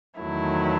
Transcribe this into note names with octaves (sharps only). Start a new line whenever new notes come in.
E2 D#3 F#3 A3 E4